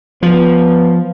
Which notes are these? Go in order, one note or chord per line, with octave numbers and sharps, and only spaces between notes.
F3 B3